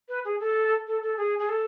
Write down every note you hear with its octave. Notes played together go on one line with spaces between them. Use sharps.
B4
G#4
A4
A4
A4
G#4
G#4
A4